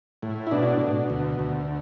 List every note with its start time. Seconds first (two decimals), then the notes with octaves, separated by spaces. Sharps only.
0.23 A2
0.47 E4
0.51 B2 D4
0.81 B2
1.10 D2
1.39 D2